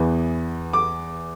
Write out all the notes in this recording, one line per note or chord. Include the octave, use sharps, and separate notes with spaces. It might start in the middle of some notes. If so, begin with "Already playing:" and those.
Already playing: E2 E3 B3
D6